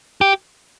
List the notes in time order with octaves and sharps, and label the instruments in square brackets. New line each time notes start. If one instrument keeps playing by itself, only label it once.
[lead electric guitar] G4